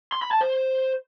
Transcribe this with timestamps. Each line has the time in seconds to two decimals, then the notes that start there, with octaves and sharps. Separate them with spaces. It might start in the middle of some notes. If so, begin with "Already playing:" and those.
0.12 C6
0.22 B5
0.31 A5
0.41 C5